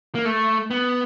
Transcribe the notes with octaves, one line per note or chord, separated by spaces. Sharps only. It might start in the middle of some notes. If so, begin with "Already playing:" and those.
A#3
A3
B3